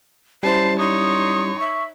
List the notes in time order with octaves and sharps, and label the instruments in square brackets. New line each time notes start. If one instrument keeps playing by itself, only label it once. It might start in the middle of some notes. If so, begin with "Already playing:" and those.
[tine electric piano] G3 C#4 E4 [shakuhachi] C5 [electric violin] A5 [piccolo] C7
[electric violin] D#4 C#5 [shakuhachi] C6 [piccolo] D#6
[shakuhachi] E5 [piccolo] C#6